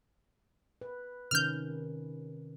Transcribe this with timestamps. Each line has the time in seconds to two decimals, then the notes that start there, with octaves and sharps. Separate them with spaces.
0.81 B4
1.31 C3 D#3 C#4 F6 G6